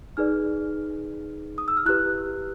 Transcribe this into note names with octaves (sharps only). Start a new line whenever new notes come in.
D#4 G#4 B4 D5 F6
D#6
E6
F6
E4 G4 B4 F#6